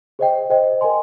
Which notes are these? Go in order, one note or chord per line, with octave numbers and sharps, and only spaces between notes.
G#4 C5 D#5 G5
G#4 C5 D#5 G5
A#4 D#5 G#5 C6